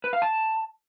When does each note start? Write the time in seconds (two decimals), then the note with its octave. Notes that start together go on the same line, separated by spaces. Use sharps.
0.04 B4
0.13 F5
0.22 A5